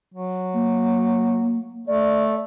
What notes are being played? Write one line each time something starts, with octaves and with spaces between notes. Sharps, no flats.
F#3
A#3
A3 D5